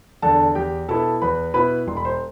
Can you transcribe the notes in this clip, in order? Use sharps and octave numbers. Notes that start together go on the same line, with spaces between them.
E2 D3 A4 A5
E2 G4 G5
B2 B3 E4 A4 A5
E2 B4 B5
B2 B3 E4 B4 B5
E1 C6
B5
C5 C6